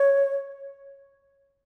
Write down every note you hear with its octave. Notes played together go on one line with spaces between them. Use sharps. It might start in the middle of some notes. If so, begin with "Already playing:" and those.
Already playing: C#5